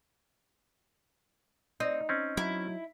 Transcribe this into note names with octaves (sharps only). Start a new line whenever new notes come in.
C4 D#4
C4 C#4
F#3 E4